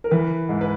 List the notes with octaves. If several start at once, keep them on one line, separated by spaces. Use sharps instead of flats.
A#4
E3 B4
G#2
B4